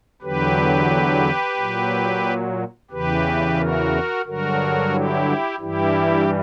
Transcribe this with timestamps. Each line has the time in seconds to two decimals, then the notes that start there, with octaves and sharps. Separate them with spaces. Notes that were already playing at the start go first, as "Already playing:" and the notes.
0.22 E2 D3 F#3 G4 B4
1.57 A#2 F#3
2.91 E2 C#3 E3 G4 B4
3.58 F#4 A#4
4.25 G2 D3 F#3 F#4 A#4
4.93 E4 G4
5.60 G2 E3 G3 E4 G4